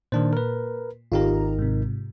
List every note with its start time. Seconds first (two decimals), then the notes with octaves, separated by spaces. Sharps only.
0.12 A#2 D#3 D4 C5
0.33 A#4 B4
1.12 G#1 D#4 F4 G4 A#4 A#5
1.58 G#2 C3